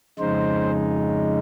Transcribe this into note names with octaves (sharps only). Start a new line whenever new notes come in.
F2 C#3 G#3 D#4 C5